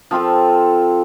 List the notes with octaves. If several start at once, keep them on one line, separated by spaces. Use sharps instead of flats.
F3 C4 F4 A4